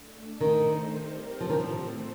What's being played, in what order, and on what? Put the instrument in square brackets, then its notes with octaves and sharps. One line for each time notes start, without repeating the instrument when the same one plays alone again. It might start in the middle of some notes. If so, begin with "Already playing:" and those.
Already playing: [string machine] A3 D4 A4
[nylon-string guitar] D#3 [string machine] A3 D#4 A4 C5
[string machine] G3 C4 G4 A#4
[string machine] A2 A3 C4 [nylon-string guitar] F3
[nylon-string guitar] D#3
F3